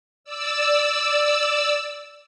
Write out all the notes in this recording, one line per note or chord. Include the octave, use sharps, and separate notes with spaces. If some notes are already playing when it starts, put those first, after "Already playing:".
D5 E6